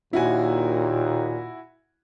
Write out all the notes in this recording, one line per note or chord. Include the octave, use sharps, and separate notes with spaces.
D#2 A#2 E4 F#4 G#5